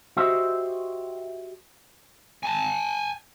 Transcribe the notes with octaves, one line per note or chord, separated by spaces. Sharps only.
F#4 G4 C5 D#5 E5
G#5 A5